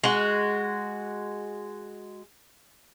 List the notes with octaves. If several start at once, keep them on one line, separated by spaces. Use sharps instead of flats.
G#3 F#4